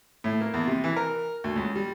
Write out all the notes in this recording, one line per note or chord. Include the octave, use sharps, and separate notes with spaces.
A2
A#3
E2
C3
E3
A#4
D2
C#2
G3